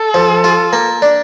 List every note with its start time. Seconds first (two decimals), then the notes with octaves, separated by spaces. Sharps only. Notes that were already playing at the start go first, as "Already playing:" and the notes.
Already playing: A4
0.14 F3
0.44 F4
0.73 A#3
1.02 D4